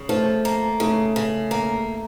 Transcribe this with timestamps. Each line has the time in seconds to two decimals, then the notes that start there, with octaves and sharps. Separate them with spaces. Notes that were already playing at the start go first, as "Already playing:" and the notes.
Already playing: C#3
0.09 F3 A3
0.45 A#3
0.80 C#3 A3
1.16 C#3
1.51 A#3